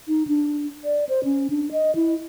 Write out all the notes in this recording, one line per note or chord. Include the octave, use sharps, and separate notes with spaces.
D#4
D4
D5
C5
C#4
D4
D#5
E4